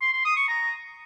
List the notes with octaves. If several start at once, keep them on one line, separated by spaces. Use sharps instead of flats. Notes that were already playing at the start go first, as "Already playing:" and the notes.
C6
C6
D#6
C#6
A#5